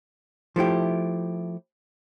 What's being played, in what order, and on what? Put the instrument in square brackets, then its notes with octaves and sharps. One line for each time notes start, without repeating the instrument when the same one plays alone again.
[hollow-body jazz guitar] F3 A3 E4 G4